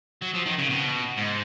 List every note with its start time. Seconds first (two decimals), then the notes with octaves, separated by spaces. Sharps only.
0.22 F#3
0.34 F3
0.46 D#3
0.58 C#3
0.70 B2
1.17 G#2